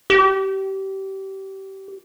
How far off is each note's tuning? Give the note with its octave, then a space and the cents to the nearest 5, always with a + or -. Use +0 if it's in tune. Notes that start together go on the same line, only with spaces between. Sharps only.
G4 -25